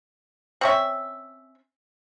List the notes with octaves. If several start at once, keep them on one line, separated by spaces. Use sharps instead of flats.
C4 C#4 E5